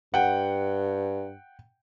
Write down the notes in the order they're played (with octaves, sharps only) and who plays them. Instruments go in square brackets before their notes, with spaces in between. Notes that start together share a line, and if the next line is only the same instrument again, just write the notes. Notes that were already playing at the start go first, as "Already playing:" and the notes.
[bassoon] G2 [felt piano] F#5 G5